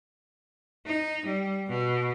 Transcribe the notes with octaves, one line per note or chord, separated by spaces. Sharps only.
D#4
G3
B2